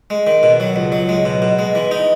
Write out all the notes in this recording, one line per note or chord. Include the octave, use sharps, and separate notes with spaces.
G#3
D#3
B2
F#3
C#2
F#3
G#3
B2
B2
G#3
E3
D#4